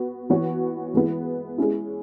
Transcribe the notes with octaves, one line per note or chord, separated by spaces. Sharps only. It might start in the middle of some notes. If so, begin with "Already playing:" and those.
Already playing: B3 F#4
E3 B3 F#4 C#5
E3 G#3 B3 E4
G#3 C#4 E4